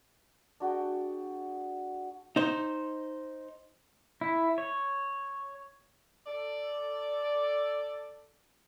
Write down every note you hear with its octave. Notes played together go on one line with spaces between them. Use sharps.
D4 F#4 G#4 G5
D#4 C5
E4
C#5
A4 D5